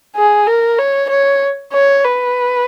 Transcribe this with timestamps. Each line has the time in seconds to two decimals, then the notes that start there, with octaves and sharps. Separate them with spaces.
0.16 G#4
0.47 A#4
0.79 C#5
1.10 C#5
1.74 C#5
2.04 B4